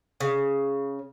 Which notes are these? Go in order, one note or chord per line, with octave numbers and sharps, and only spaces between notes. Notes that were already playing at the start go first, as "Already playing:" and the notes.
C#3